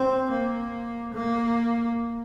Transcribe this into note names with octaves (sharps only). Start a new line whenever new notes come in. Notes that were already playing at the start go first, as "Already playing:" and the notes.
Already playing: C4
A#3
A#3